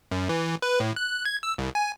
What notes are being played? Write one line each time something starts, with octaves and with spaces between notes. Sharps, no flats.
F#2
E3
B4
A2
F#6
G#6
E6
C2
G#5